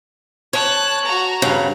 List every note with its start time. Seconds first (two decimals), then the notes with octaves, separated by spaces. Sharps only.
0.53 C#5 A5 F#6
1.05 F#4 A#5
1.42 G2 C#3